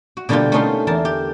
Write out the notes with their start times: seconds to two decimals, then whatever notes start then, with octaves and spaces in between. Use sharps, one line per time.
0.17 F#4
0.29 B2 D3 G3 A#3 F4 G4
0.52 A3 B3 C#4 D#4 F5 C6
0.87 E2 D3 A#4 A5
1.05 G4